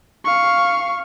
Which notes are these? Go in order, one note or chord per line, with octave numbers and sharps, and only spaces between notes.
F5 C#6